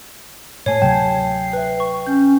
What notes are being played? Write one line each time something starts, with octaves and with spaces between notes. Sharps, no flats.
A2 A3 C#5 G#5 A5 C7
D2 C3 F#3 G5 A5 G#6
B4 E5
C#6
C#4 G6